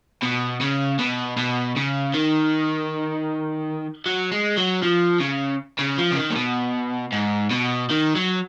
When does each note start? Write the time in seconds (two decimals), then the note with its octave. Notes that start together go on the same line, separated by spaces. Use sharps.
0.23 B2
0.61 C#3
0.99 B2
1.37 B2
1.76 C#3
2.14 D#3
4.06 F#3
4.32 G#3
4.58 F#3
4.83 F3
5.20 C#3
5.79 C#3
5.98 F3
6.11 C#3
6.16 D#3
6.30 A#2
6.36 B2
7.12 G#2
7.51 B2
7.90 D#3
8.15 F#3